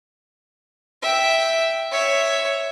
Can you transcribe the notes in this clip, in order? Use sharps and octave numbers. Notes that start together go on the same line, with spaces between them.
E5 G5
C#5 E5